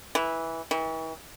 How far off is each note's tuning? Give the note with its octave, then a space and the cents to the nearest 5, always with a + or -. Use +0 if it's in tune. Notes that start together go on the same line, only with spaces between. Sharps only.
E3 -10
E3 -40